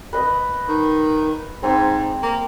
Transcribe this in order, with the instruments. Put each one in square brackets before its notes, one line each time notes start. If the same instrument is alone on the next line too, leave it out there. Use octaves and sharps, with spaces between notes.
[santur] B4 D#5
[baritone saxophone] D#3
[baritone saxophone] G#2 [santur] C4
[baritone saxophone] A#3